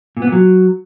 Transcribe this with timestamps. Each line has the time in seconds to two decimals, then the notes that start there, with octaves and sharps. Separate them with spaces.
0.17 A#2
0.22 B3
0.27 A#2
0.32 F#3